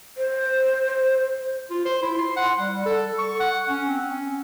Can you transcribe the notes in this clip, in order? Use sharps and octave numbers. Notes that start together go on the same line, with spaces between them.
C5
F4
C5
E4
C6
F#5
G3
A4
C#6
F#5
C#4
C4
C#4